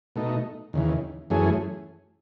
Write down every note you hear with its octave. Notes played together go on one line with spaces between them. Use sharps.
B2 A3 D#4
D#2 C#3 E3
F#2 E3 A3 C#4 G#4